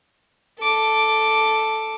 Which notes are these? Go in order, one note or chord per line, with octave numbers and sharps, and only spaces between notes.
A4 D6